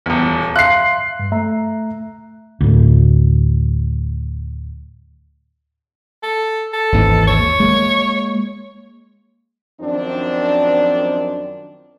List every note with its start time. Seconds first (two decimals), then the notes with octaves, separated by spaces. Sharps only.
0.06 D#1 E2
0.56 E5 F5 C6 F#6 C7
1.19 G2
1.32 A3 E5 A#5
2.61 D2 A2
6.23 A4
6.73 A4
6.92 G#1 D#2 E3
7.27 C#5
7.60 G#3 A#3
9.80 F#2 D#3 F3 C4 D4